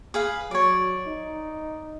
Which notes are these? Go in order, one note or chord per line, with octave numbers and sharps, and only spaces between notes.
G#4 B4 F5
F#3 C#5 D5
D#4